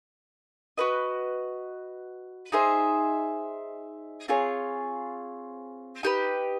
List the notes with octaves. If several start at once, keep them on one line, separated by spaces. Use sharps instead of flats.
F#4 B4 D#5
D#4 G#4 C5 E5
C4 F4 G#4 C#5
D#4 G4 B4